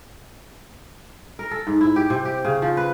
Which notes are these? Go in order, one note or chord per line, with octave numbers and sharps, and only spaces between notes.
A#4
A4
G#2
E4
G4
C3
G4
C#3
F3
B4